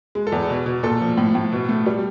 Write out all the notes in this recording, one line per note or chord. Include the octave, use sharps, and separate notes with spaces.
G#3
A4
E2
B2
B2
A#2 A4
F3
A2
A2
B2
A3
G3